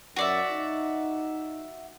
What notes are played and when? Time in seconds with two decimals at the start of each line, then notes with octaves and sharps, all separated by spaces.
0.16 F#2 F#4 D5 E5
0.50 D#4